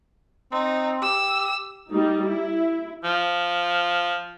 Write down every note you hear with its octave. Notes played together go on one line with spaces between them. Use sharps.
C4 D#4
G4 E6
G3 D#4
E4
F3